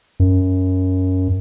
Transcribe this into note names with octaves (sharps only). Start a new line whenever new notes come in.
F#2